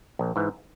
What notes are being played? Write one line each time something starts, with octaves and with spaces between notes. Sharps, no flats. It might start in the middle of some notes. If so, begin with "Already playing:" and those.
A#1
G#2 E3